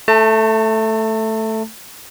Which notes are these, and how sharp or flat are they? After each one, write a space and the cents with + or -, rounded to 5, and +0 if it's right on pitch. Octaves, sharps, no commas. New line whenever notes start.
A3 +0 A5 +35